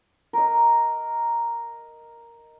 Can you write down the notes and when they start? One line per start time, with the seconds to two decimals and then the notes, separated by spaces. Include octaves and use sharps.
0.33 A#4 D#5